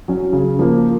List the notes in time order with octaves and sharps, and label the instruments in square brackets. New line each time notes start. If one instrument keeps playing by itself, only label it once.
[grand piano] F#3 C#4
C#3
F3 A#3